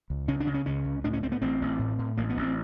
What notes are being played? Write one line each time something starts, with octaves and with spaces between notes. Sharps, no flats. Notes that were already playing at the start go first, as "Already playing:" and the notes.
C#2
C#3 C#4
D4
C#3
C#4
C#2 C#4
C#2
A2 D4
C#4
A2 C4
B3
A1 C4
A1
A2
A2
A1 A#3
B3
A1
C4